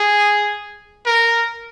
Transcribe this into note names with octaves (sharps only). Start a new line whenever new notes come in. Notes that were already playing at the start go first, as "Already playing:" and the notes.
Already playing: G#4
A#4